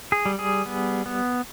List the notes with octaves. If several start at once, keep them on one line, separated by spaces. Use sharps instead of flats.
G#4
G3
G#4
B3
B3